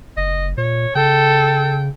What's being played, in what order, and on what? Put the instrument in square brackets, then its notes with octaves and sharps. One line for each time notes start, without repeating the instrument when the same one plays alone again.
[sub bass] F#1 [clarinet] D#5
[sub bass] A#2 [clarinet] C#5
[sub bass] C#3 [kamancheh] A4 [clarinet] G5